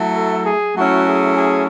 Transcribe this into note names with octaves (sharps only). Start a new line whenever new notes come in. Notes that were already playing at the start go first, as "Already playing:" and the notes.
Already playing: F#3 A3 E4
A4
G#4
F#3 A3 C#4 E4 F#4
G#4
G#4